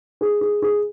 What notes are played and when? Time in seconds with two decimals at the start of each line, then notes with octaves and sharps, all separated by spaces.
0.21 G#4
0.41 G#4
0.62 G#4